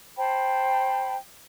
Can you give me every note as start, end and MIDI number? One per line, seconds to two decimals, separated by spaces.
0.17 1.14 72
0.17 1.14 79
0.17 1.14 81
0.17 1.14 83